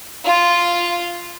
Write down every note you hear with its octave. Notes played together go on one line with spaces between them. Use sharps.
F4